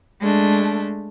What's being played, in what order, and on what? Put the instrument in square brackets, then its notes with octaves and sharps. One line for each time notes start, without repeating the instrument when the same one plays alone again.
[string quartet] G#3 A3 D4